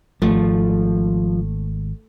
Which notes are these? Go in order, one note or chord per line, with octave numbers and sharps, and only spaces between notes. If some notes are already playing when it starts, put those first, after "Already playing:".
G#1 F3 A3